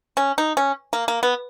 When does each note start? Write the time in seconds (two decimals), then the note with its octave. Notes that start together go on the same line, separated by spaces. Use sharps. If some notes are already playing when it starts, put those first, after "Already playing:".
0.17 C#4
0.38 D#4
0.57 C#4
0.93 A#3
1.08 A#3
1.23 B3